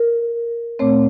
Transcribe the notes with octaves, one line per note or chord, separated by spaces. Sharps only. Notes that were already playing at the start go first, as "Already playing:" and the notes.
Already playing: A#4
A#2 A3 C4 C#5